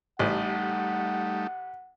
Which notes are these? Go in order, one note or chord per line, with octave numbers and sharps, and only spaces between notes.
A1 G3 A3 D#4 F#5